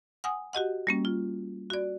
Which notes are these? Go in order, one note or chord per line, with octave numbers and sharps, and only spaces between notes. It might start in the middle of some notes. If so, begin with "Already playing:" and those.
F#5 G#5 D#6
F#4 G4 D#5 F#5
G3 A#3 C#4
F4
F#4 D5